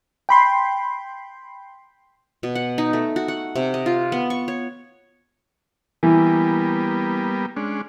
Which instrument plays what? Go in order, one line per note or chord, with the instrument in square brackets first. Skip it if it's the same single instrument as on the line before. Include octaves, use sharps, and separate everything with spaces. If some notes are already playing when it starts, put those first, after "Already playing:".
[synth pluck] G5 B5 C6
[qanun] B2
F#5
D#4
A3
F#4
F#5
C3
D#5
F4
B3
C#6
C#5
[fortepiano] E3 [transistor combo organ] G3 A#3 B3
[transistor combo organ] G#3 C#4 D4